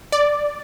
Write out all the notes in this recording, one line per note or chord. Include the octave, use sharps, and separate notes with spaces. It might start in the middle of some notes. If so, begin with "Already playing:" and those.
D5